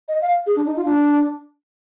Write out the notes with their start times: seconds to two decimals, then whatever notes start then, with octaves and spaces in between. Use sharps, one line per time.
0.08 D#5
0.22 F5
0.47 G#4
0.56 D4
0.66 D#4
0.76 F4
0.85 D4